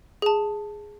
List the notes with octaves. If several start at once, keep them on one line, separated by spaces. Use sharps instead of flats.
G#4 A5